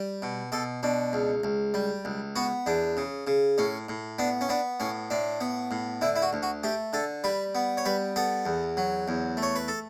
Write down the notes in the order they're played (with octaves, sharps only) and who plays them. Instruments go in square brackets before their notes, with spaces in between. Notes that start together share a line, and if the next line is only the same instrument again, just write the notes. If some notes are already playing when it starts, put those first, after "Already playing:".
Already playing: [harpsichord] G3
B2
B2 A4
B2 D4
C#2
C#2
G3
C#2
B3 F#4
E2 D4
C#3
C#3
A2 C#4
A2
B3 D4
C#4
B3 D4
A2 C#4
A2 D4
B3
A2
D3 E4
E4
F#4
D2
F#4
A3 G4
D3 A4
G3 B4
B3
C#5
G3 B4
B3 A4
E2
F#3
E2
A3
C#5
B4
A4